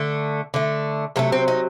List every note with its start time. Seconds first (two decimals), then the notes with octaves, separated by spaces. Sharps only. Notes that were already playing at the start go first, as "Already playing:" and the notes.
Already playing: D3 A3
0.54 D3 A3
1.16 C3 F#3 A3 A#3
1.32 C4
1.48 D#4